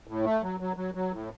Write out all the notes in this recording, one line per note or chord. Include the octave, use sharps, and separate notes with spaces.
A2
A3
F#3
F#3
F#3
F#3
A2